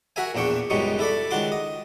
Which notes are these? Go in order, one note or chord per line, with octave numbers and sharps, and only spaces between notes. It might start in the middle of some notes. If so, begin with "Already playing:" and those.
F#4 A#4 E5 G#5
A#1 E2 D4 G5 C#6
C#2 F#2 B2 G3 D#4 C#6
E4 A4 D5 B5
C#2 D#3 F#4 C6 D6
D#5